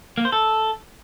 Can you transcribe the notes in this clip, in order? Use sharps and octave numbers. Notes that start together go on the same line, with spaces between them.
A#3
C5
A4